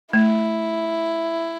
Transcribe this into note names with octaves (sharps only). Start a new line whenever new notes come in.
A3 E4